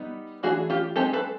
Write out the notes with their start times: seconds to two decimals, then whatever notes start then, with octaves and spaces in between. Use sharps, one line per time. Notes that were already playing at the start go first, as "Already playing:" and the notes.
Already playing: G3 B3 D#4
0.43 E3 A3 D4 F#4 G#4
0.70 F4 G4
0.96 G#3 C4 D#4 G4 A4
1.13 A4 B4